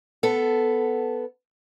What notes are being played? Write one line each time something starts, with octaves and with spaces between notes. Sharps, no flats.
B3 A4